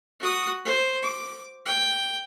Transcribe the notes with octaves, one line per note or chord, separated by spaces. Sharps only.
F#4 D#6
C5
D6
G5